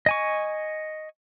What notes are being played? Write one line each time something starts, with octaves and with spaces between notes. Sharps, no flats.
D#5 G#5 C#6